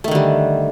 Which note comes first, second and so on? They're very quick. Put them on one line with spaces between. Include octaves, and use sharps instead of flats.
A3 D#3 D3 G3